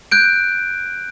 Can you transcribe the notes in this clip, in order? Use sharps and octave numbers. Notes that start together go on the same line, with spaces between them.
F#6 G6 D7